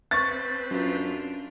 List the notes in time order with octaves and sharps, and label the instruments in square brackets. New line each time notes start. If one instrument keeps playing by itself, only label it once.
[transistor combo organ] C4 B4 [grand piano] C#6 A6
[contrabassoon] F#2 [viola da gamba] D4 F4